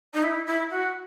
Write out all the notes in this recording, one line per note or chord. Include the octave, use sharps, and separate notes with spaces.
D#4
E4
E4
F#4